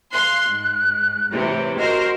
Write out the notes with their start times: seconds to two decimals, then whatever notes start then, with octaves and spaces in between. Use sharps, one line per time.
0.12 F5 C6 F#6
0.48 G#2
1.31 A2 C3 E3
1.78 F#4 A#4 C5 D#5